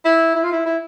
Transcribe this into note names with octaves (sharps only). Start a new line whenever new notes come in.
E4
E4
F4
E4
E4